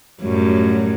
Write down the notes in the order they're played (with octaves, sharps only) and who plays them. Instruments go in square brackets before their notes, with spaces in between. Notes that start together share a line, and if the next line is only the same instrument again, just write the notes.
[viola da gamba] F#2 A2 G3